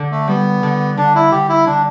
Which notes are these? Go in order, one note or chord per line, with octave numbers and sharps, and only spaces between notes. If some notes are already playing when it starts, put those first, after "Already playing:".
Already playing: D3
A3
G3 B3
D3
D3 D4
E4
D3 G4
E4
D3 D4